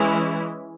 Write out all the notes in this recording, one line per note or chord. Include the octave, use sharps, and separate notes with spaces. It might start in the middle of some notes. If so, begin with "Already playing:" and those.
Already playing: E3 G#3 C#4 E4